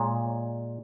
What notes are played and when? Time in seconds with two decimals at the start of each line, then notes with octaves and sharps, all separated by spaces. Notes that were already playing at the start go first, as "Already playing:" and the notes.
Already playing: A#2 G#3 C#5